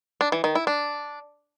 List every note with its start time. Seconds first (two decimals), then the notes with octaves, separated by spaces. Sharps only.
0.21 D4
0.32 E3
0.44 D#3
0.55 E4
0.67 D4